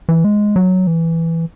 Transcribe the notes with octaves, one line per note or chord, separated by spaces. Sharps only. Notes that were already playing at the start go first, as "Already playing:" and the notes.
E3
G#3
F#3
E3